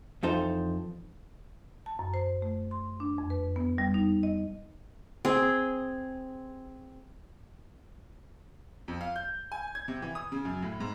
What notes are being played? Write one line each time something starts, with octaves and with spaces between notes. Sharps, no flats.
F2 E3 D#4 A4 C5
A5
F#2
C5
A3
C6
D4
F2
B4
B3
G3
D#4
D#5
C4 G#4
F2
F5
G6
G#5
G#6
C3
E3
D#6
C#3
F#2
A2
G#2